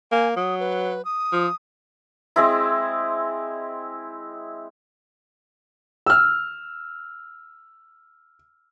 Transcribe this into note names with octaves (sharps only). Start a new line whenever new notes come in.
A#3 G#5
F#3 D#6
B4
D#6
F3
G#3 C4 E4
E6 F6